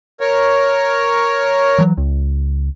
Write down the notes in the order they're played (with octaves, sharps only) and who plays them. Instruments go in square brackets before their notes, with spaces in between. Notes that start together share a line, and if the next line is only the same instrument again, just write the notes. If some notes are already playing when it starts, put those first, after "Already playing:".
[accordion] A#4 C#5
[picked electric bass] E3 F#3
C#2